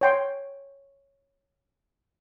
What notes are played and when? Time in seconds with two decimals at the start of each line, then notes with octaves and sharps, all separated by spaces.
0.01 C#5 G5 C6